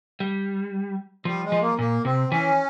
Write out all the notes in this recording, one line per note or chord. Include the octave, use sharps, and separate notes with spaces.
G3
F3 G3
G#3
F3
A#3
A#2 A#3
C3 C4
E3 C#4